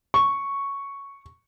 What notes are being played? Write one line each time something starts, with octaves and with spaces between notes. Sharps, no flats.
C#6